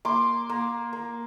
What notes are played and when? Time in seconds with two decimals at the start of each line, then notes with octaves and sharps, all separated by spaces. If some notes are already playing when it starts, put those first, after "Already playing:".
0.05 A#3 C6 D6
0.49 A#3
0.93 A#3